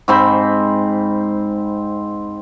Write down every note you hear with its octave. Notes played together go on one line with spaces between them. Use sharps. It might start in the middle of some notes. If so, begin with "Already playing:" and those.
G#2 C4 B5